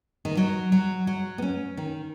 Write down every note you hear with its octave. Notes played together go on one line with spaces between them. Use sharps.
D#3
F#3
F#3
F#3
B3
C#4
D#3